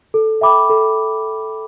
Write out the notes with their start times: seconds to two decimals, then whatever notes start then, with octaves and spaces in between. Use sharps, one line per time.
0.14 A4
0.41 E5 G5 B5 D6
0.70 A4